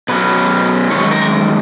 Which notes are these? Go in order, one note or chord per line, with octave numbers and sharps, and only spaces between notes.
B2 F#3 C#4 B4
F#2 D#3 G#3 C#5
A#4